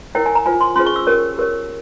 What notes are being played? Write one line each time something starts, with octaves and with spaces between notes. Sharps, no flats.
E4 A#4 C#5 G5
G#5
A#5
F4 C5 G#5
C6
C#4 F4 G#4 C5 C6
C#6
E6
C#4 G4 A#4 C#5
G4 A#4 C#5